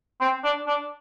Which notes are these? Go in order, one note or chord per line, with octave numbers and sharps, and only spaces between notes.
C4
D4
D4